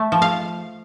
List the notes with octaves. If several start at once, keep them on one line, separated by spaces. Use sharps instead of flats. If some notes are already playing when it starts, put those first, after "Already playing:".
Already playing: A3
F3
F5